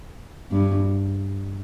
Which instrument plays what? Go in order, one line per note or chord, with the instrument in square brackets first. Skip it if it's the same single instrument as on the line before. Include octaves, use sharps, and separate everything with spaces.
[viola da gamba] G2